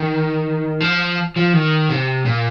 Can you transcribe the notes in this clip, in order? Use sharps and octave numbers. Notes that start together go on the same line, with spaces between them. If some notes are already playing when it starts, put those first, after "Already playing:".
Already playing: D#3
F3
F3
D#3
C3
A#2